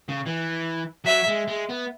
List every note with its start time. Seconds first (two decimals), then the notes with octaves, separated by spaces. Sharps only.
0.08 C#3
0.26 E3
1.05 F#3 E5
1.28 G#3
1.48 G#3
1.70 B3